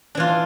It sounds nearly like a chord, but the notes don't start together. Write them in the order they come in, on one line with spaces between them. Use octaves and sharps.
D4 E3 F4